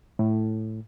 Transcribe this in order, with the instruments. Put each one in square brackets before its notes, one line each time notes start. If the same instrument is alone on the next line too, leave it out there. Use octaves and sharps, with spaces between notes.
[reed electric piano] A2